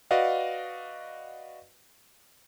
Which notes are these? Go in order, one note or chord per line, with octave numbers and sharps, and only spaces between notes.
F#4 B4 D5 D#5 F5 F#5